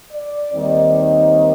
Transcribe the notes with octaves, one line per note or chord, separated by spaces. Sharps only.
D5
D#2 D#3 G3 C4 D#4 D5